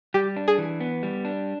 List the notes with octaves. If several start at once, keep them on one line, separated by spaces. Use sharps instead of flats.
G3 G4
D4
G#4
E3
B3
G3
D4